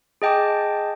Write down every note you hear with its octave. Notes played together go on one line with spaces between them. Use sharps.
G#4 D#5 G5 A5 D6